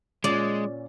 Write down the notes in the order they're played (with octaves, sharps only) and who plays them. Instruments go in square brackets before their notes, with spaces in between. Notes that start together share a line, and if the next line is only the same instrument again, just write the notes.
[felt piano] A#2 C#4 [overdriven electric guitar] G#3 [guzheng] D5